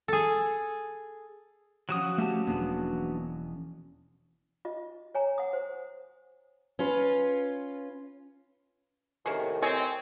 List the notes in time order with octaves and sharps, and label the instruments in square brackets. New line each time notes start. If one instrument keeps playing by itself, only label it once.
[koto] G#4 A4
[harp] F3 C#4 [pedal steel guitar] F#3 F#4 D#6
[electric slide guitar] A3 G4 A5
[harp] E1 [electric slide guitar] A#3 B3 D4
[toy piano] F4 D#5
C#5 G#5 A#5
F#5 D#6
C5
[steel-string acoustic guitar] C#4 F4 B4
[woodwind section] A2 C3 D#3 [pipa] A#3 C#4 G#4
[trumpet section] C4 [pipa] C#5 D#5 G#5